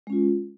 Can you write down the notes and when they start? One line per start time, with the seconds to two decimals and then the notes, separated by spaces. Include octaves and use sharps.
0.07 G#3
0.10 C#4
0.12 F4